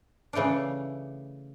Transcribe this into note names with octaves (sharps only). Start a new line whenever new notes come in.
C#3 E3 A3 D4